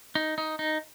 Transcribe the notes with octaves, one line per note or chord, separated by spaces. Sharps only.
D#4
D#4
D#4